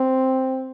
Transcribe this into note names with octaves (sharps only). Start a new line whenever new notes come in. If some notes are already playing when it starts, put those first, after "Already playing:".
Already playing: C4